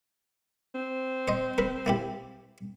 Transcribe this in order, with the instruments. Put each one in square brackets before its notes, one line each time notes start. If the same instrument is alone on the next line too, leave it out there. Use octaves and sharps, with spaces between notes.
[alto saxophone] C4
[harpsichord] C5 D#5
A#4 B4
A#3 E4 G4